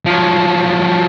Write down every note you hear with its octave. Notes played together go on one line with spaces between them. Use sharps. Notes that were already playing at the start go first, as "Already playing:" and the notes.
F3 F#3